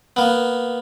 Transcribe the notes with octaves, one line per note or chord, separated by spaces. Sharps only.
A#3 B3